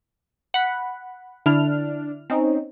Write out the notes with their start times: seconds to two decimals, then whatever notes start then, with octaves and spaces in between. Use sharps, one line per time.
0.54 F#5 B5
1.46 D3 D4 E4 F6
2.30 C4 C#4 D#4